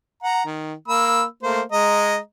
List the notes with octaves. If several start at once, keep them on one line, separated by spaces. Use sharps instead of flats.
F#5 A#5
D#3
A#3 B5 E6
A3 A#3 C5
G#3 D#5 A#5